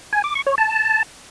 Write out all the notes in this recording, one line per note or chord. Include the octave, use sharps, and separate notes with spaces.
G#5
D6
C#6
C#5
A5